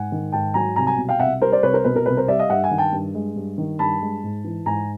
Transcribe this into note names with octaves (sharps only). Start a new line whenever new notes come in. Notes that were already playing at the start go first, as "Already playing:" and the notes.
Already playing: G#2 F#5 G#5
D#3
G#2 G5 A5
F#3 G#5 A#5
C2 G#5 A#5
G#5 A#5
B2
F5 G5
C2 E5 F#5
G3 A#4 C5
C5 D5
C2 B4 C#5
A#4 C5
B2 B4
A#4
C2 B4
A#4 C5
G3 D5 E5
D#5 F5
G2 E5 F#5
F#5 G#5
D#3
G5 A5
G2
G#3
G2
D#3
G2 A5 B5
G#3
G#2
E3
G#2 G#5 A#5